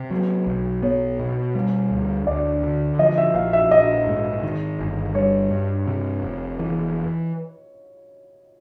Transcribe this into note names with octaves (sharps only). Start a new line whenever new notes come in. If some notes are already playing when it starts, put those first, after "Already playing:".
Already playing: C3
F#3
B1
B3 C#5
B2
G3
D2
D2 D5
D3
F3 D#5
E5
A#1 F5
E5
A#1 D#5
G#2
D#3
G1
G3 C#5
G2
C3
F1
E3